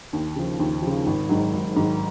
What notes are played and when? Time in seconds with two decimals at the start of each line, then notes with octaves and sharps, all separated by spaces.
0.13 D#2
0.36 C#3 F3
0.59 D#2
0.82 C#3 F3
1.07 G#1
1.29 G#2 D#3 F#3
1.54 G#1
1.76 G#2 D#3 F#3